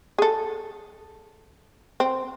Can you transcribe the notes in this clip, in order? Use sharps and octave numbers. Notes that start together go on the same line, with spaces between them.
G#4 A4
C4